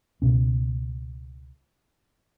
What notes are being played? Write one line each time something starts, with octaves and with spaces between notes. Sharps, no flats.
C#2 B2 C#4